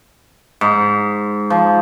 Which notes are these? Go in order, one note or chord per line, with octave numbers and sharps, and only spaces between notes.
G#2
F3